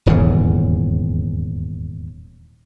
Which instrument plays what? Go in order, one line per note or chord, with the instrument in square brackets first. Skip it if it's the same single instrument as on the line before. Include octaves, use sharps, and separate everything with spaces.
[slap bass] D#1 E2 G#2 C#3